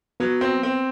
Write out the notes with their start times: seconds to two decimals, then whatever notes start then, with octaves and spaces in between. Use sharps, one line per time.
0.20 F#3 B3
0.41 C4
0.63 C4